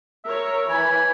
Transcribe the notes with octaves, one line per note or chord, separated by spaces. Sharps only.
A#4 C#5 E5
E3 G#5 B5